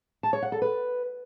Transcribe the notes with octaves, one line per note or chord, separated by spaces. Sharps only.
A5
C#5
F#5
A4
B4